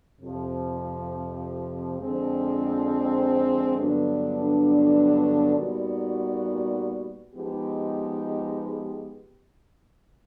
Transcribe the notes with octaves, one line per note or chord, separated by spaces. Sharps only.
F2 C3 F3
F2 D3 F3 G#3 C4
G2 D3 F#3 B3 D4
A#2 G3 B3 D#4 F#4
F3 G#3 B3 D#4 G4